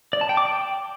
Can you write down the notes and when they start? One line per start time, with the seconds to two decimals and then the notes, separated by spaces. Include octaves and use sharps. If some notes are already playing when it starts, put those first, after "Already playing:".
0.13 D5
0.21 A5
0.29 G5
0.37 D6
0.45 G5